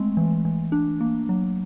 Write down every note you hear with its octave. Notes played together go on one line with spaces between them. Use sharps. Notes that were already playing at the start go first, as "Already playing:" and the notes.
Already playing: G#3 A3 C4
E3
E3
D4
A#3
F#3